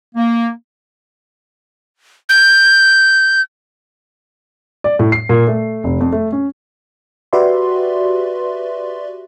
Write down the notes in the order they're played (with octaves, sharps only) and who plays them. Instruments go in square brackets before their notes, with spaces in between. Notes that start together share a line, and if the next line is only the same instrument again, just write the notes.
[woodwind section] A#3
[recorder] G6
[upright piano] D5
A2
C7
A#2
A3
F1
F2
A3
C#4
[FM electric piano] F#4 G4 B4 D5 E5 C6